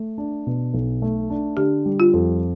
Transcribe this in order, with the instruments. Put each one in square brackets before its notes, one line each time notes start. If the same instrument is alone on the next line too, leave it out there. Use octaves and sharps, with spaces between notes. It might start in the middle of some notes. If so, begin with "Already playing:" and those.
Already playing: [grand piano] A3
D4
B2
B1
A3
D4
[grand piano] D3 [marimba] G4
[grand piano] G3
[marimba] F4
[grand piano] F2